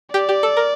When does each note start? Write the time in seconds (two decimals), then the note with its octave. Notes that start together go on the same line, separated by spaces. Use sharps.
0.14 G4 D5
0.29 G4
0.43 A4
0.57 A#4